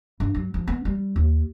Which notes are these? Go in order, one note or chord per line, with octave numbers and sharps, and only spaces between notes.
G2
F#3
F3
B3
G3
D#2